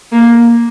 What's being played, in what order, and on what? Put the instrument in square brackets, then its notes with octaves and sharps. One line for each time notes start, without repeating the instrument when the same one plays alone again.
[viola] A#3